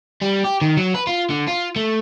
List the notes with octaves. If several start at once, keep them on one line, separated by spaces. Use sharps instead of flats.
G3
G4
D#3
F#3
B4
F4
D3
F4
A3